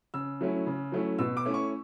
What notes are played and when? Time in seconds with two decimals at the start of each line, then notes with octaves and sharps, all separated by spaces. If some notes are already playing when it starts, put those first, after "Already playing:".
0.14 C#3 E6
0.41 F#3 A3 C#4 E4
0.67 C#3
0.92 F#3 A3 C#4 E4
1.19 B2 E6
1.37 D6
1.45 A3 C#4 E4
1.54 C#6